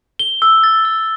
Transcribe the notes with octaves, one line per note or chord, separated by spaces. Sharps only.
G7
E6
A6
E6